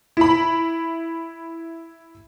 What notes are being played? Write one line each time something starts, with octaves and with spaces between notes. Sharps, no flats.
E4 B5